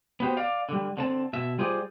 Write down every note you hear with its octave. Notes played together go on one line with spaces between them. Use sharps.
B3 F#4 G4 C5
D5 F5
D3 G3
D3 C4 A5
B2 E5
G3 F4 G#4 C5 D5